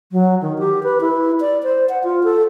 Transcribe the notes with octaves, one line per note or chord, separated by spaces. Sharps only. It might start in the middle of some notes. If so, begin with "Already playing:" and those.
F#3
D#3
G4
B4
E4
D5
C5
F#5
F4
A4